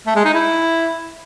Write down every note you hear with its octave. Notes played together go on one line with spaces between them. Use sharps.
A3
G#3
D#4
E4